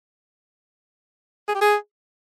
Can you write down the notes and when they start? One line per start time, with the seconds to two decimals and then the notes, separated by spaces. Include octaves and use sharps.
1.48 G#4
1.55 G4
1.61 G#4